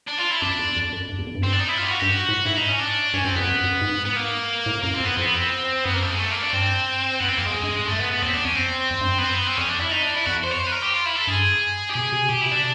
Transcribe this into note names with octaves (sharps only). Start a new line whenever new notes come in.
D4
F4
E4
F#2 D4
F2
F2
F#2
G2
E2
F2
G2
C4
D4
D#4
E4
F4
G4
F#4
G2 G4
G#2 F#4
A2
G#2 E4
D#4
C#4
D4
G2 C#4
F#2 C4
F2 B3
F#2
F#2
G#2
B3
A#3
A2
F#2 A#3
C4
F2
B3
F2 C4
B3
C4
F#2 B3
A#3
A3
G#3
A3
A#3
D4
G2 C4
F#2 B3
C4
F2 A#3
G#3
F2
G2
G#2
G2 A3
B3
B3
E2 C4
E2 D4
F2 C#4
C4
F2
G2
F#2
B3
C4
B3
C4
F2 C#4
D4
E4
D#4
D4
E4
F2 F#4
C5
C#5
C5
B4
A#4
G4
F4
E4
A4
G2 G#4
G4
B2 G#4
C3
B2 G4
C3 E4
D4